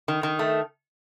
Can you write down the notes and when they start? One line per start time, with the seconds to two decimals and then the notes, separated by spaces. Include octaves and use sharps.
0.08 D#3
0.23 D#3
0.39 A3